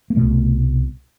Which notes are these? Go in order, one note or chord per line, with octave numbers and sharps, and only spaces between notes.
A#3
C2 B2 A3